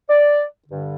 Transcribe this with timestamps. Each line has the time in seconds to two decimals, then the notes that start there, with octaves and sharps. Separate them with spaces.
0.09 D5
0.67 G2 D3